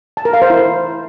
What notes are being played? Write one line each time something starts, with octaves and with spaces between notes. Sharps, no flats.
A5
A#4
F5
C5
E4